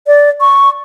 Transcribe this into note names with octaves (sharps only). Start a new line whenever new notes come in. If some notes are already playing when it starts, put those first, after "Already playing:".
D5
C#6